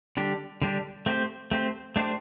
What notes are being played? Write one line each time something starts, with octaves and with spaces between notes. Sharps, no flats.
D3 G3 D4 G4
D3 G3 D4 G4
A3 C4 G4 C5
A3 C4 G4 C5
A3 D4 G4 C5